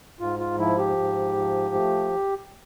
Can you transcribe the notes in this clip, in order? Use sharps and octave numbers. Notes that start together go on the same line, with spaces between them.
G#2 F4
F4
F3 E4
G4
G#2
F3
A3